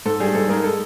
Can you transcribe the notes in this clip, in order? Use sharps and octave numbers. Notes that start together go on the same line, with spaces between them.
G#2 A4
G3 G#4
G#2 A4
G#3 A#4
A4